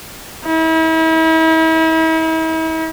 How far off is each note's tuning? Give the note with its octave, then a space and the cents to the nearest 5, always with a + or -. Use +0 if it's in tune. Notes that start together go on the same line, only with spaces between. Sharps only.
E4 -40